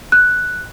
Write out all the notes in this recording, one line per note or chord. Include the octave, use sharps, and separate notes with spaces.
F#6